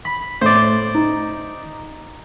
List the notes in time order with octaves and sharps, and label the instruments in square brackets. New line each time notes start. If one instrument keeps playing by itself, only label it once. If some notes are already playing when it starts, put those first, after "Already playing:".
[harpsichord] B5
[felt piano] A2 [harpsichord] C5 D5
[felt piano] D#4